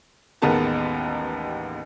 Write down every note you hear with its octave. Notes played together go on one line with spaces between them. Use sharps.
A1 D#2 G#3 B3 A#4 A5